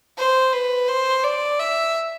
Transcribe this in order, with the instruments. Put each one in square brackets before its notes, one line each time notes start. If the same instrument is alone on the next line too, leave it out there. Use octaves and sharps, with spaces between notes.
[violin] C5
B4
C5
D5
E5